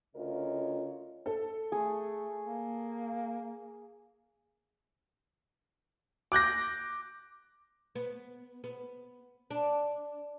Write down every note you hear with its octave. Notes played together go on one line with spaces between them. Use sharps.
D2 C#3 F4 A#4 C#5 D#5
A4
A3 G#4
A#3
D6 F#6 G6 A#6
B3
B3
D4